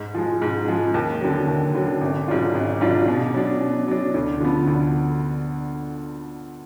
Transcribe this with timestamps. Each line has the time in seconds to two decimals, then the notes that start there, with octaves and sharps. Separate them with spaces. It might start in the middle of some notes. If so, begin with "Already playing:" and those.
Already playing: G#2
0.15 F3 G#3
0.42 G#2
0.68 F3 G#3
0.94 D#2
1.21 D3 F#3
1.48 D#2
1.75 D3 F#3
2.01 G#1
2.28 G#2 F#3 D4 F4
2.55 G#1
2.81 G#2 F#3 D4 F4
3.08 B2
3.34 F#3 D4
3.61 B2
3.88 F#3 D4
4.14 D2
4.41 D3 F3 B3
4.68 D2